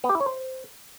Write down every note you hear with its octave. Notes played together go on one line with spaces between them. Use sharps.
B3
G4
E4
C#5
C5